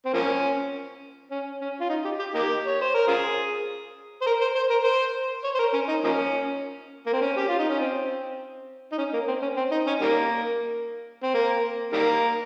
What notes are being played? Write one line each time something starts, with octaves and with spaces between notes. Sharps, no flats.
C4
F3 A#3 C#4
C#4
C#4
F4
D#4
G4
G4
A#3 D#4 G4
C#5
C5
A#4
C#4 F4 G#4
C5
A#4
C5
C5
A#4
C5
C#5
C5
A#4
C#4
D#4
F3 A#3 C#4
A#3
C4
C#4
G4
F4
D#4
C#4
C4
D#4
C#4
A#3
C4
C#4
C4
D#4
C#4
D#3 G3 A#3
C4
A#3
D#3 G3 A#3